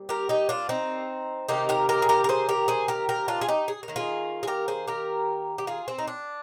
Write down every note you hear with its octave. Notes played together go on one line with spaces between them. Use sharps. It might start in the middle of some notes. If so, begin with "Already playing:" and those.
Already playing: A#2 G3 C4
G4 A#4
D#4 G4
D4 F4
C4 D#4
C3 D#3 A#3 D#4 G4
G4 A#4
G4 A#4
G#4
G4 A#4
A#4
G#4 C5
G4 A#4
G#4 C5
G4 A#4
G4 A#4
D4 F4
G#4
D#4 G4
G#4
A#4
D#3 A#3
F4 G#4
G#4
G4 A#4
G#4 C5
G4 A#4
G4
F4 G#4
C4
D#4
D4